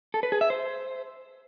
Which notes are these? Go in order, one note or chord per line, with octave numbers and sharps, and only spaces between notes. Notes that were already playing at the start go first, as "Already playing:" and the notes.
A4
B4
G#4
E5
C5